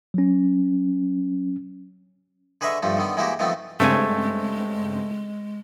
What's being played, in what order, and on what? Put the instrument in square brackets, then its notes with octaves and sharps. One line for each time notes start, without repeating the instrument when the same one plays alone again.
[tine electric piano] F#3 C#4
[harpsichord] D3 G#4 B4 D#5 E5 C#6
G2 F3 A3
D3 D#3 B3
E3 G#3 A#3 F#4 G4
D#3 F3 A3 B3 C4
[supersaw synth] G2 C#3 C4 [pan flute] G#3 [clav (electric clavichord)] A3 G#5